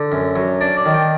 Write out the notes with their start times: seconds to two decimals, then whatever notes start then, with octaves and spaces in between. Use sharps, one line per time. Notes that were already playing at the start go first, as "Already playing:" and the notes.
Already playing: D3
0.12 F#2
0.36 F#3
0.61 D4 D5
0.77 D5
0.86 D#3
0.94 G5